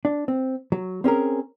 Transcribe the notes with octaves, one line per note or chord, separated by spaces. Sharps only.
D4
C4
F#3
C4 C#4 G#4 A#4